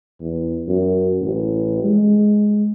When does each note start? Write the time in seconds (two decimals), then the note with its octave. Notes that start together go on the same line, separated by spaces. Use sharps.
0.21 E2
0.68 F#2
1.21 A1
1.84 G#3